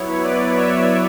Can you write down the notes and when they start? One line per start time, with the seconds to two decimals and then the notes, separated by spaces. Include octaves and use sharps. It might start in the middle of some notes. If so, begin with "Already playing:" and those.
Already playing: F#3 B3 E4 C#5
0.23 B4 D5
0.57 C#5 E5